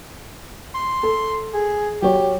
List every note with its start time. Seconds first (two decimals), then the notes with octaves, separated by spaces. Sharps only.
0.75 C6
1.03 A4
1.54 G#4
2.02 F#3 G4 C#5